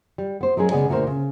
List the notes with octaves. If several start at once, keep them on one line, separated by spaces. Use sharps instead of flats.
G3
B3 C5
F#3 G#3 C#4 G#4 A#4
C#3 G#3 B3 G#4 D5 G#5
D2 A#2 D3 A#3 A#4 C5
C#3